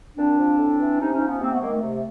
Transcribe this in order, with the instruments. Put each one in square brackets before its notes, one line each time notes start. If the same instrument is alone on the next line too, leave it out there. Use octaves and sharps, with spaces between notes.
[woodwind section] A#2 C4 D4
F3
A2
E3
C3 C#4 D#4
C#4 D#4
F3
B3 C#4
C3 A#3 C4
A3 B3
D#3 G#3 A#3
A3
C3